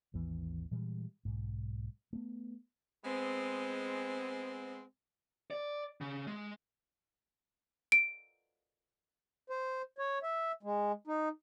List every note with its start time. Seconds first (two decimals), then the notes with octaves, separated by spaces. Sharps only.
0.14 G#1 D#2 E3 B3
0.71 A#2 E3 G3 G#3
1.25 B1 G#2
2.13 A3 B3
3.05 G#3 B3 C4
5.51 D5
6.01 C#3
6.27 G#3
7.92 D7
9.50 C5
9.98 C#5
10.23 E5
10.63 G#3
11.07 D#4